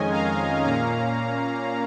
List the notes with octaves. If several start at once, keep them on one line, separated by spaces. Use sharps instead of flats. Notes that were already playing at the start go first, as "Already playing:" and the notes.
Already playing: F2 D#3 G#3 C#4 D#5 G#5
F5 A#5
A#2 A#3 C#4 F5 A#5